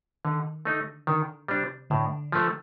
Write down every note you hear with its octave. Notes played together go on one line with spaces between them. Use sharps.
D3 D#3
D3 A3 D#4
D3 D#3
C3 G3 D4
A2 D3
F3 A3